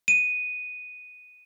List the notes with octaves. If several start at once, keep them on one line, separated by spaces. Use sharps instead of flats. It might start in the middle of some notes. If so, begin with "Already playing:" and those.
D#7